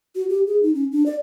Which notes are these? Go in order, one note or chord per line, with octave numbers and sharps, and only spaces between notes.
F#4
G4
G#4
D#4
C#4
D4
D5